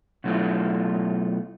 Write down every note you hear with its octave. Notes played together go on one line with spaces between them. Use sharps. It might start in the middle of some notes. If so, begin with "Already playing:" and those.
B2 F#3 A3 E4 F4